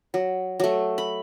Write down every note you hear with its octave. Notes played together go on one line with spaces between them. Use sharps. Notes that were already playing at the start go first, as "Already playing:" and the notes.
F#3
F#3 A3
B5